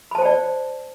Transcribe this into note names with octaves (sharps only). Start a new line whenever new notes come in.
C5 D5 G5 A5 B5